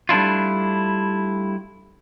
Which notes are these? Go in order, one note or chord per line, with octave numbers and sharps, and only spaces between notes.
G3 A3 D4 E4 F4